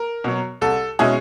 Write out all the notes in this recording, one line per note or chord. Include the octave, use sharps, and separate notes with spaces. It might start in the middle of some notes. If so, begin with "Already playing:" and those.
Already playing: A#4
B2 F#3
C2 A4
B2 G#3 C#4 E4 G#4